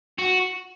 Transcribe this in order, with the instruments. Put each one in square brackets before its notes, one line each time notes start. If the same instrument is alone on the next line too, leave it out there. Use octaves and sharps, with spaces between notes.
[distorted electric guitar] F#4